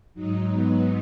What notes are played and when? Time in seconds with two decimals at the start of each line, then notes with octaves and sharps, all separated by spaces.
0.14 G#2 F#3 D#4
0.48 B3